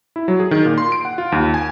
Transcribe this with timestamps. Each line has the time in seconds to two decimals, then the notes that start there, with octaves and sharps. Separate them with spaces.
0.16 E4
0.28 F#3
0.40 G#4
0.51 D#3
0.65 A#2
0.78 C6
0.92 D7
1.05 F#5
1.18 F4
1.32 D#2
1.54 G#5